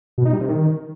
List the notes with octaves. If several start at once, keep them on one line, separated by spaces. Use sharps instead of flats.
B2
D#4
G3
C3
D#3